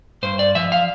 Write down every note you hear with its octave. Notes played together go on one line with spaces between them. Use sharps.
G2 C5
D5
F3 E5
F5